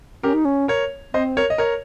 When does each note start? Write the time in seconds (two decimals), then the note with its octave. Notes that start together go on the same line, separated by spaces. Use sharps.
0.23 C#4 G4 A#4
0.34 D#4
0.45 C#4
0.68 A#4 C#5
1.13 C4 C5 D#5
1.37 A#4 C#5
1.50 D#5
1.58 A#4 C#5